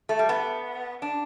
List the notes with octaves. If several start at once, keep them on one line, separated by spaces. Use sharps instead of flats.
A3
G3
B3
D4